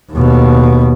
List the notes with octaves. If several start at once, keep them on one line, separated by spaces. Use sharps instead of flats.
D#2 B2